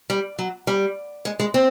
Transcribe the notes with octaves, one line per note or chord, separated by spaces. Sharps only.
G3
F#3
G3
G#3
G#3
C4